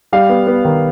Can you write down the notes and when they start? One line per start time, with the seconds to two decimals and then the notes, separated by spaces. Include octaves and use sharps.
0.12 G3 F5
0.29 B3
0.47 B3
0.65 D#3